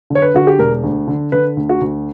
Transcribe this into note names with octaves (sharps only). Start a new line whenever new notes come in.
D3
C#5
B4
D3 F#4
G4
E1 A#4
D2
D3
D3 B4
D2
F#4
D2